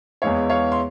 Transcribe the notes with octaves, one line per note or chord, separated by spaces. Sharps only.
E2 E3 G#3 E4 C#5 F5
C#5 F5
C6